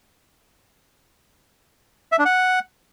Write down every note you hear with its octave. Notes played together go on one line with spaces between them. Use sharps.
E5
D4
F#5